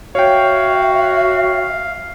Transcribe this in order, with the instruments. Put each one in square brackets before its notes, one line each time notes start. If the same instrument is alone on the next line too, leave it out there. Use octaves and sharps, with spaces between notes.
[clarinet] F#4 [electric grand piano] C#5 G5 [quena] E5 [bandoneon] F5